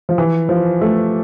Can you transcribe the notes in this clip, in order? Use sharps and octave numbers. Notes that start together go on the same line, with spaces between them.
F3
E3
F3
A3